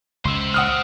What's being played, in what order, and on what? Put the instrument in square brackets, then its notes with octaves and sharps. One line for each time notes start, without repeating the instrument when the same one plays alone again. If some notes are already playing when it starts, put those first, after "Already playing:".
[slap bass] C#2 [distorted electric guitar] C5 E5
[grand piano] F#5 D#6 F6